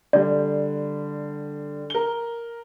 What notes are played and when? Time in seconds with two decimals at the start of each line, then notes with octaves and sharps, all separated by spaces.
0.13 D3 G3 D5
1.90 A#4 G7